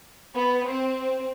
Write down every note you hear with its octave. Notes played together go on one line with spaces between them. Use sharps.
B3
C4